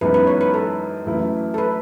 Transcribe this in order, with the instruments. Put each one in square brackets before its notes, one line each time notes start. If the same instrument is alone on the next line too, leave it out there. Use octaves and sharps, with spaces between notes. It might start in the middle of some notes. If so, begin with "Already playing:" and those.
[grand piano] F#2 E3 G#3 B3 D#4 [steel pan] B4
[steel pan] B4
C#5
B4
A4
[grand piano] F#2 E3 A3 E4
[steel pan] A4
B4